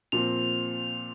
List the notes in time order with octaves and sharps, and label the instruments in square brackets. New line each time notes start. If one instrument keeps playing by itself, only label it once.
[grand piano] A#2 F3 C4 [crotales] F7